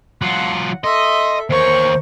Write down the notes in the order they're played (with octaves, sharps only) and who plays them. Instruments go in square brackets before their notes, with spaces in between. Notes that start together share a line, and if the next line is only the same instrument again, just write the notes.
[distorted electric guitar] F#3 F4 [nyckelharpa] F#5
[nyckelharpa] A4 E5 [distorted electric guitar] D#5 [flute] C6
[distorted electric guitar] D#2 C#5 [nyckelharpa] A#4 C#6 [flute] C5